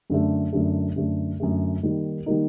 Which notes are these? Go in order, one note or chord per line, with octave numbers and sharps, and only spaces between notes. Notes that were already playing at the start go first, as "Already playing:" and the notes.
F#2 D3 A3
F#2 D3 A3
F#2 D3 A3
F#2 D3 A3
D#3 G3 A#3 D#4
D#3 G3 A#3 D#4